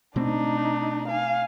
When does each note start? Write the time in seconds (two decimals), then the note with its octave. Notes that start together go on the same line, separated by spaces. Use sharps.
0.16 B2 A3 C4 D4 D#4
1.08 F5 G#5